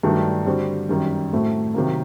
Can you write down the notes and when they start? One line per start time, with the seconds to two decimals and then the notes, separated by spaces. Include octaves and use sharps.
0.03 G2 D#3 F#3 A3 D4
0.46 D3 G3 C4 F#4
0.89 F#2 D#3 G3
1.32 A2 A3 C4 F#4
1.74 C3 D#3 F#3 A#3